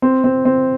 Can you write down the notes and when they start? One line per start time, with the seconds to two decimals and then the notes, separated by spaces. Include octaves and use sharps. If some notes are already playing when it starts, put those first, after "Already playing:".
0.02 C4
0.24 C4
0.45 C4